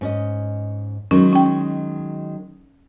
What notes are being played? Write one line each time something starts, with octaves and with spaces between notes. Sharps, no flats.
G#2 C#4 D#5
D#3 F#3 G#3 C#4
C#4 G5